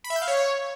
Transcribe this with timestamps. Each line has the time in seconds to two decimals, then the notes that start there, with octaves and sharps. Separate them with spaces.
0.04 B5
0.10 E5
0.16 G6
0.22 F5
0.28 C#5